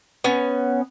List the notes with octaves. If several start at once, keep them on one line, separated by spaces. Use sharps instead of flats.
B3 C#4